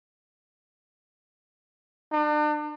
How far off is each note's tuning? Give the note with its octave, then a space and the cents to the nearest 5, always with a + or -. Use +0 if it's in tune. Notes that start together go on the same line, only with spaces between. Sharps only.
D4 +40